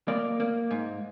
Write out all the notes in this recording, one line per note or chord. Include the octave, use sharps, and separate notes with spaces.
A#3 D5
A#3
G#2